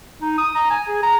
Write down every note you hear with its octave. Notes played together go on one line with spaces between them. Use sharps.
D#4
D#6
A#5
G#5
G#4
A#5